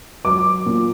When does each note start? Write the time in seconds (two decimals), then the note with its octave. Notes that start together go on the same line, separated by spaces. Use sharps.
0.25 F#3 D6
0.66 A#2